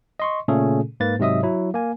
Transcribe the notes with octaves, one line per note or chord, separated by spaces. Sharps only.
D#5 C6 C#6
A#2 C#3 A3 C#4 G#4 A4
G#2 A#3 B4 A6
G#2 C3 F#3 D#5 E5 D#6
F#3 E4
A#3 G#5